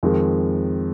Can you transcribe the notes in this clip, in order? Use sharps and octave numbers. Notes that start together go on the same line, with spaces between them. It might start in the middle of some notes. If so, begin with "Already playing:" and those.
F2 D#3 G#3